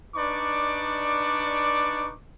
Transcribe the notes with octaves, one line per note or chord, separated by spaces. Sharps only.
D4 D#4 B4 D5 C#6 D6